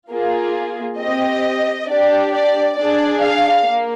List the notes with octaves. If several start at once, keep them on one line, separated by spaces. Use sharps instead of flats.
A#3 F4 G#4
C4 G4 D#5
D4 G4 D5
D5
D4 G#4 D5
F5
A#3